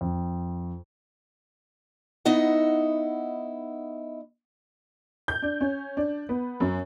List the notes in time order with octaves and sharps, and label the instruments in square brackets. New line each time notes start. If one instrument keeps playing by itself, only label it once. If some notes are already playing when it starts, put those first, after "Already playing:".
[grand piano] F2
[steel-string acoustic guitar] B3 D#4 E4 D#5 F#5
[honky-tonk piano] G6
D4
C#4
D4
B3
F#2